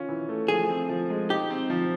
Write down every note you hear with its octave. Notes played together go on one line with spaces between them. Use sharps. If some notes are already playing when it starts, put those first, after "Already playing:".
Already playing: D#3 C#4 F4
E3
A3
F3 G#4
C4
F3
G#3
D#4 G4
C4
F3